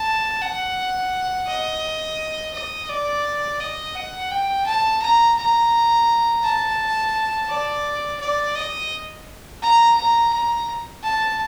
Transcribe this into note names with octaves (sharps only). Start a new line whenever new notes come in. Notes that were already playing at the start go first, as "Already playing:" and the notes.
Already playing: A5
F#5
D#5
D#5
D5
D#5
F#5
G5
A5
A#5
A#5
A5
D5
D5
D#5
A#5
A#5
A#5
A5